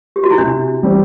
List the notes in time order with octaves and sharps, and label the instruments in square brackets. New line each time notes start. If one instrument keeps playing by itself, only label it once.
[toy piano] G4
F#4
E4
[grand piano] C3 [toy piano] D4
[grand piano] E3 G3 C4